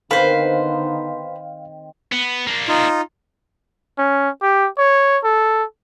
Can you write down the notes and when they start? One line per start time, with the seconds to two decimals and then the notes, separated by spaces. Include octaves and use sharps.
0.11 D3 D#3 B3 C4 D#4 B4 C5 F5
2.12 B3
2.47 A#3 D4
2.68 D#4 F4
3.99 C#4
4.42 G4
4.78 C#5
5.24 A4